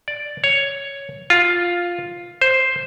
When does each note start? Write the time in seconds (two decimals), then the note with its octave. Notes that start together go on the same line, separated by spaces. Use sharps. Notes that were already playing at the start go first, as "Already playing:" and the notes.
0.08 D5
0.44 C#5
1.30 F4
2.41 C5